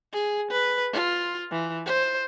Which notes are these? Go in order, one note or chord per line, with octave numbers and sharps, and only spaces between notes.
G#4
B4
F4
E3
C5